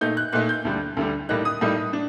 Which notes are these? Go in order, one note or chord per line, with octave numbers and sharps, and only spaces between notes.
A#2 A3 D#4 G6
F#6
A#2 A3 D#4 F#6
G6
D2 D3 G3
D2 D3 G3
A2 G3 A#3 D#4 F#6
D#6
A2 G3 A#3 D#4
D4